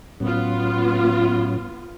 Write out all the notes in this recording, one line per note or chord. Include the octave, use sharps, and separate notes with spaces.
A2 F#3 B3 C#4 F4